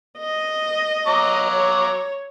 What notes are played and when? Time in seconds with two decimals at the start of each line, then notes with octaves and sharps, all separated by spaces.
0.19 D#5
1.07 F#3 A#5 D6
1.50 C#5